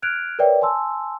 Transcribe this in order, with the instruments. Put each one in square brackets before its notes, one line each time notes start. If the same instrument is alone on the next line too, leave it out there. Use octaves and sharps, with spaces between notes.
[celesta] F6 F#6 G#6 D7 F7
A#4 B4 C#5 D5 E5 G5
G#5 A5 C6 E6